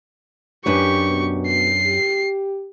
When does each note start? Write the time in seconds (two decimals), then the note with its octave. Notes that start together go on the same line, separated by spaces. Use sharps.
0.66 F#2 D4 G4 B4 C#6
1.09 B2
1.47 C7
1.86 G4